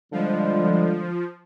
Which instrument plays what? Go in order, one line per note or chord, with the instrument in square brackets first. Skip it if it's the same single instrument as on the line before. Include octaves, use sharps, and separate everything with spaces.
[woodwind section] D3 G3 G#3 [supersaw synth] F3